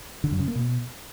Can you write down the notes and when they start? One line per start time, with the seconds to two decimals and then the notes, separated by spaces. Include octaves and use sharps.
0.24 D3
0.32 F#2
0.40 C#3
0.48 A#3
0.55 B2